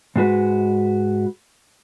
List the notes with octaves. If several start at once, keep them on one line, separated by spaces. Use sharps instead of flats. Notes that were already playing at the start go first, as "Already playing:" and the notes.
G#2 G#3 F#4 B4